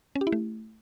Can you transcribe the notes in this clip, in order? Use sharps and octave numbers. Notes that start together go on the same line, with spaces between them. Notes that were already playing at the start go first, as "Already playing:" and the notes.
C#4
G4
E4
A3